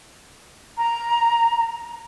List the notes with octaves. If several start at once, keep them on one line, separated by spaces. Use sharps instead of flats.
A#5